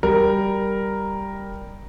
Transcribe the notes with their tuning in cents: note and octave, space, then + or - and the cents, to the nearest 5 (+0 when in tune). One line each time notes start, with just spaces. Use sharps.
G3 +0 A#4 +0